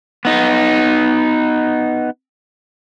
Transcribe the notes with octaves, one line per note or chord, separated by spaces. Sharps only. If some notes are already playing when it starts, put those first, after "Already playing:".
B3 D#4